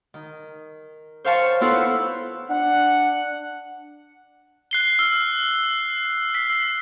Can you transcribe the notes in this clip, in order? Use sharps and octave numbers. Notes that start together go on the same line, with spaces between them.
D#3
C5 C#5 F5 G5 A5 C#6
B3 E4 F4 A4 B4 C5
D4 F#5
F#6 C7 G7
E6 F6 G7
B6 C7
E6